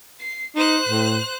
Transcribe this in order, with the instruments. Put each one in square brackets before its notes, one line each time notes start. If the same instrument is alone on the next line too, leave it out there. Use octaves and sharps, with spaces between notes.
[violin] C7
[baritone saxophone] D#4 [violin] C5 F#6
[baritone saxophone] A2